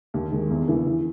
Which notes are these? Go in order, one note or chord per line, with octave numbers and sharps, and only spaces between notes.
D#2
D#3 G#3
E2
C#3 E3
E3